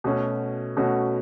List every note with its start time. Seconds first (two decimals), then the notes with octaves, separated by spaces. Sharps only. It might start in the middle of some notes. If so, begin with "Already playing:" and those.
0.04 B2 A3 C#4 F#4
0.77 B2 A3 C#4 F#4